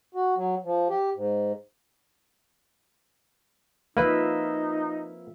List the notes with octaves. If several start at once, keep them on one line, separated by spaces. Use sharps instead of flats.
F#4
F#3
F3
G4
G#2
F3 A#3 D#4 B4 E5 F5